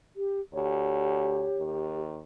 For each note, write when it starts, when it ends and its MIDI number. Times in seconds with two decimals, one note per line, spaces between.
0.16 0.41 67
0.53 1.47 38
0.53 2.01 67
0.53 1.62 73
1.56 2.21 39